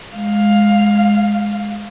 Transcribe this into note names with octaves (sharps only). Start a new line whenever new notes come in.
G#3 F5